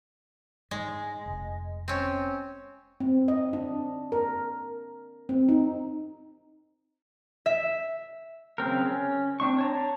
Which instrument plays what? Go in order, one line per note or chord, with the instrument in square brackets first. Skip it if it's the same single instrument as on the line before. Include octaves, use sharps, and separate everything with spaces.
[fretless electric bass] G#2 [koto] G#3
[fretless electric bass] F1
[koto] C4 C#4
[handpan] C4
D#5
D4
A#4
C4
D#4
[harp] E5
[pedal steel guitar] C#3 F#3 C4 A#4
C#4
C4 D4 C#6
C#5 A5 A#5